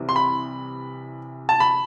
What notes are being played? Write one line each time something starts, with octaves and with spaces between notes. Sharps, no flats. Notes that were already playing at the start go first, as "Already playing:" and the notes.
Already playing: C2 C3 E3
C6
B5
A5
B5